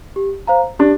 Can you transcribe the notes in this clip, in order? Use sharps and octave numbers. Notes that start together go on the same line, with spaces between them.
G4
C5 F5 A#5
D4 G4